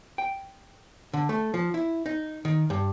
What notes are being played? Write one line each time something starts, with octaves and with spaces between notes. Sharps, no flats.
G5
D3
A3
F3
E4
D#4
D#3
G2